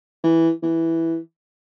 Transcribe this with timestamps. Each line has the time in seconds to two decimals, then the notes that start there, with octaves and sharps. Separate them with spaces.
0.24 E3
0.63 E3